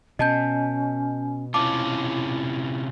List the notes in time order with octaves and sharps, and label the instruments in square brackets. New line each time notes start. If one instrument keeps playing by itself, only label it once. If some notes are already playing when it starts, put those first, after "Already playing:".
[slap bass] B2 [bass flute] C#4 [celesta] D#5 A5 G6
[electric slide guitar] C3 C#4 F4 [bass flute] E4 [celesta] A5 D6